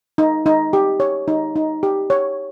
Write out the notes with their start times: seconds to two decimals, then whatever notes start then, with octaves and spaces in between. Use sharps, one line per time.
0.18 D#4
0.46 D#4
0.73 G4
1.00 C#5
1.28 D#4
1.56 D#4
1.83 G4
2.10 C#5